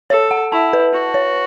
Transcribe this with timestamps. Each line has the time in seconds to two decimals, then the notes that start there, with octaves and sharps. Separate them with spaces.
0.10 A4 C#5
0.31 F#5
0.52 E4 A5
0.73 B4
0.93 F#4
1.14 C#5